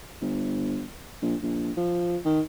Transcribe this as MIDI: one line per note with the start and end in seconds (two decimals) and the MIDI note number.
0.21 0.85 31
1.22 1.36 34
1.43 1.71 34
1.77 2.17 53
2.25 2.41 51